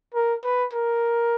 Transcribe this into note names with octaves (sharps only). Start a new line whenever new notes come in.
A#4
B4
A#4